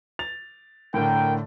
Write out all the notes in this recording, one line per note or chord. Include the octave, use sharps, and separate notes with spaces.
A6 F7
A2 D3 A#4 G5